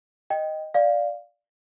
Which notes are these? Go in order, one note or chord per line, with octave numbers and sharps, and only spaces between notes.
D#5 G5
D5 F5